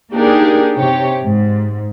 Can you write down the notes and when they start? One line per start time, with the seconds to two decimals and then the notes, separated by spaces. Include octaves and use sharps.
0.13 A#3 D4 D#4 G4 G#4 A#4
0.76 C3 G4 C#5
1.22 G#2